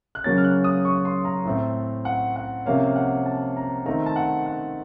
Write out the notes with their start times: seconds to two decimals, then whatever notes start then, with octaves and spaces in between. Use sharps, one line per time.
0.15 F#6
0.24 C#3 F#3 A#3 C#4 A6
0.37 F6
0.44 F#6
0.64 D#6
0.85 C#6
1.05 C6
1.25 A#5
1.45 A2 A3 C4
2.05 F#5
2.36 F#5
2.66 C3 F3 A#3 C#4 F5
2.96 F#5
3.26 A5
3.57 A#5
3.86 D#3 A3 C4 A#5
4.06 A5
4.16 F#5
4.46 F#5